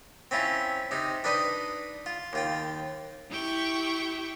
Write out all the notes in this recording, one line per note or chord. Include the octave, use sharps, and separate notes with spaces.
C4 C#4 E4 F4
C3 D#4
D4 D#4 B4 D5 D#5
F4
D#2 F4 G5
E4 G4 G5 C#6